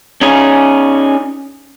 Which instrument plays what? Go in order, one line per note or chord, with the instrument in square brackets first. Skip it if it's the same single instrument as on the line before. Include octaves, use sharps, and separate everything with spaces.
[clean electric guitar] C#4 D#4 G#4